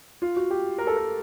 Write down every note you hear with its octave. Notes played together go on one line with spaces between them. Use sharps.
F4
F#4
G4
A#4
A4
A#4